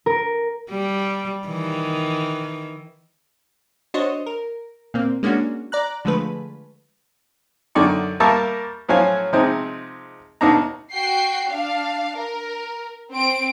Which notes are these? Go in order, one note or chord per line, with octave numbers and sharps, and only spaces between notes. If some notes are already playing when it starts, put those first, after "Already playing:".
A#4
G3
D#3 E3
D4 F#4 C5 C#5 D#5
A#4
A#2 A#3 C4
G#3 A#3 C#4 D4 F#4
D5 A#5 F#6
D3 F3 G#3 A3 B4
F#2 D3 D#3 D5 C#6
G3 A#3 A#4 E5 A5 C#6
A2 F3 F#3 C#4 F5 G#5
C3 F3 G#3 C4 D#4
D#2 B2 D4 D#4 A#5
F#4 G5 C7
D4 F5
A#4
C4 D7